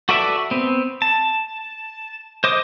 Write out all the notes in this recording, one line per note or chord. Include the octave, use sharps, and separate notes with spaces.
F#4 A4 B4 D5 E5
B3 C4
A5
C5 D#5 D6 D#6